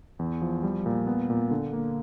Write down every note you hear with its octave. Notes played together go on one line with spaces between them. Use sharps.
E2
F3
G3
A#2
B3
A#2
D3
A#3